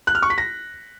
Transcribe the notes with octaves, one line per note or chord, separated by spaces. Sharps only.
F#6
F6
C#6
B6
A#6